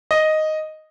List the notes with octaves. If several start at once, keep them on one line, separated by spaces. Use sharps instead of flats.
D#5